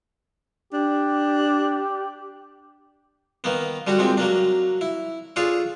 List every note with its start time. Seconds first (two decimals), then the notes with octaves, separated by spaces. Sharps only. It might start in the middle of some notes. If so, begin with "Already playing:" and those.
0.73 D4 G4
3.44 D#3 A#3 B3
3.87 D3 G3 D4 F#4
3.99 A#2 G#3 C4 G4
4.17 F#3 A#3 D4
4.81 E4
5.36 D4 F4 G#4 A4 C#5